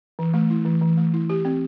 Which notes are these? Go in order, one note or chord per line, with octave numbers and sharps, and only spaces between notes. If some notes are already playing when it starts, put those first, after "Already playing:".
E3
A3
E4
E3
E3
A3
E4
G4
C4